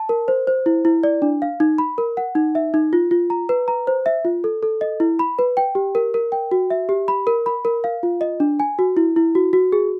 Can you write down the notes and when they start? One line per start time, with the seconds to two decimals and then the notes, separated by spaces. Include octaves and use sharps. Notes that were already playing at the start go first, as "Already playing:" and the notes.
Already playing: A5
0.09 A#4
0.28 C5
0.47 C5
0.66 E4
0.85 E4
1.03 D5
1.22 D4
1.42 F5
1.60 D#4
1.78 B5
1.98 A#4
2.17 F#5
2.35 D#4
2.55 E5
2.74 D#4
2.93 F4
3.11 F4
3.30 A#5
3.49 B4
3.68 A#5
3.87 C5
4.06 E5
4.25 F4
4.44 A4
4.63 A4
4.81 D#5
5.00 E4
5.19 B5
5.39 B4
5.57 G5
5.75 G4
5.95 A#4
6.14 A#4
6.32 G5
6.51 F#4
6.70 E5
6.89 G4
7.08 B5
7.27 A#4
7.46 B5
7.65 A#4
7.84 F5
8.03 F4
8.21 D#5
8.40 D4
8.60 G#5
8.79 F#4
8.97 E4
9.16 E4
9.35 F#4
9.53 F#4
9.72 G#4